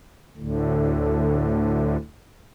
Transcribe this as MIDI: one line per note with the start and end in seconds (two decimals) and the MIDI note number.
0.37 1.97 38
0.37 1.97 45
0.37 1.97 50